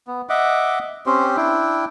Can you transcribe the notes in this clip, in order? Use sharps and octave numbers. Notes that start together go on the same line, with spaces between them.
B3
D#5 E5 F#5 D6
C4 C#4 G4 C5
D4 E4 G5